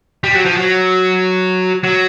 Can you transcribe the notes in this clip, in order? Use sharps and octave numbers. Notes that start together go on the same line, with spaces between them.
G3
F#3
F3
F#3
F#3